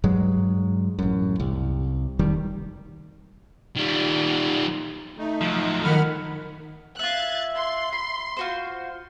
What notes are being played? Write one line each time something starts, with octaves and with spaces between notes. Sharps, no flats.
G2 F#3 G#3
A1 F#2
C2
F1 D#3 G3
D#3 G3
A3 D#4
F3 F#3
D#3 F#5 B5 F6
F4 E5 F#6 G#6 A6
C6
B5
F4 F#4 C5